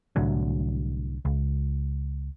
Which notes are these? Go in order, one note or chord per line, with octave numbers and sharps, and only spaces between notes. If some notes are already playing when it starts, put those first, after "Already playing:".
C2 A2 D3 F#3
C#2